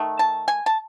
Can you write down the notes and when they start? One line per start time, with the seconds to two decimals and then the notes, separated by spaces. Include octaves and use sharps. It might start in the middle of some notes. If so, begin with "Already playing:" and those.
Already playing: D#3 A3
0.19 A5
0.48 G#5
0.66 A5